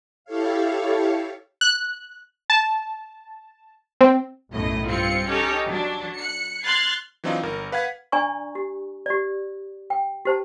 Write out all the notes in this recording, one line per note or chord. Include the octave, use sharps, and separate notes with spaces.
E4 G4 A4 C#5 F5
F#6
A5
C4
B1 F#2 A2 D#5
G2 C4 F4 C#7
C#4 D#4 G4 A4 C#5
F#3 D4
F#6 C#7
C6 F6 F#6 G#6 A6 C7
E3 F#3 C4 D4 D#4 F4
G1 A#4
B4 F5 F#5 G#6 B6
D4 D5 G#5 A#5 C#6
G4
G4 D5
G5
G4 C5 A5